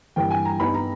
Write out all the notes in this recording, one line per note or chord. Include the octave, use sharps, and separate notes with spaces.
G2 E3 A#3 G5
G#5
A#5
G2 G3 B3 D#4 B5
A#5